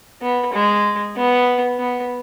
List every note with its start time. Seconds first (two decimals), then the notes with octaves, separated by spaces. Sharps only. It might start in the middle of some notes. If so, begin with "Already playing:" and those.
0.22 B3
0.53 G#3
1.17 B3
1.80 B3